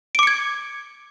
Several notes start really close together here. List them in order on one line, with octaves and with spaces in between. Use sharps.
D7 D6 C#7 G#6